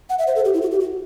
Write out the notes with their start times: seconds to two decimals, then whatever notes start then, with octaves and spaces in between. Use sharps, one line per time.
0.09 F#5
0.19 E5
0.27 C5
0.36 A4
0.45 G4
0.54 E4
0.62 F#4
0.71 G4
0.80 F#4